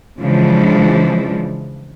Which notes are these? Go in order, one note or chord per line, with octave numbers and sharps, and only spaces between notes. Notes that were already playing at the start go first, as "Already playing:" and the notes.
C#3 E3 F3 G#3 D4